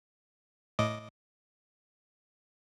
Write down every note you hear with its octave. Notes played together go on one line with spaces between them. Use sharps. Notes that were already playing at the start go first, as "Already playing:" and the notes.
A2 D#5 D6